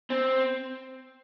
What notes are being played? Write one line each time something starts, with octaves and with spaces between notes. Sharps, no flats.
C4